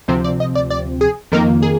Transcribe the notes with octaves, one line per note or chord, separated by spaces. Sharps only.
D2 C3 F3 C4 C5
D5
D#5
D5
D5
G#4
F2 D#3 A#3 A#4
G#4